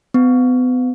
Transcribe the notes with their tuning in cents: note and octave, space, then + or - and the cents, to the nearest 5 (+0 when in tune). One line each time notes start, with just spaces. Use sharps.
B3 +35